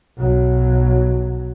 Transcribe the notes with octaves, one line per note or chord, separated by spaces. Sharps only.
B1 F#3